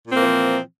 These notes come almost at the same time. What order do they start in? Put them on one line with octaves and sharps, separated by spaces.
A#2 C4 E3 A#3 F3